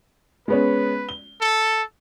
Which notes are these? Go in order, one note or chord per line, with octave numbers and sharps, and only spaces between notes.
G#3 B3 C#4 B4
G7
A4